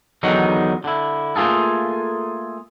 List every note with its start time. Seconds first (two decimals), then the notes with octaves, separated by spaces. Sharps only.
0.23 E2 D3 D#3 F#3 D#4
0.84 D3 E4
1.36 A3 A#3 F4 G#4 A4